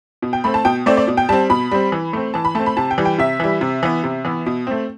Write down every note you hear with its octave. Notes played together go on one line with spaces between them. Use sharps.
B2
G5
A3 C4 B5
A5
B2 G5
A3 C4 D5
D5
B2
G5
G3 C4 A5
B2 B5
G3 C4
E3
A3 C4
E3 A5
B5
A3 C4 A5
B5
C3 A5
G5
E3 G3
G5
C3 E5
E3 G3
C3
E3 B3
C3
E3 B3
B2
A3 C4